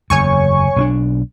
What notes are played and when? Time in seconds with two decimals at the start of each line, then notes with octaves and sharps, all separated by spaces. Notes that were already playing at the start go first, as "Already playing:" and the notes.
0.10 F#1 E2 C#5 G#5 C#6
0.76 B1 C4 D4